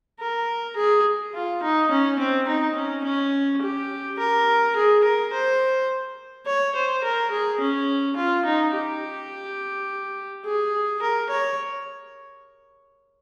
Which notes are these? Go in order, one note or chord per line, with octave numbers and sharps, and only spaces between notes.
A#4
G#4
F4
D#4
C#4
C4
D#4
C#4
C#4
G4
A#4
G#4
A#4
C5
C#5
C5
A#4
G#4
C#4
F4
D#4
G4
G#4
A#4
C#5